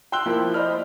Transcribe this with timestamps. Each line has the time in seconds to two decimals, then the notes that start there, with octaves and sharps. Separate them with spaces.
0.12 G5 C6 E6 F#6 G7
0.26 F3 A#3 E4
0.54 C5 D5 D#5 B5 F6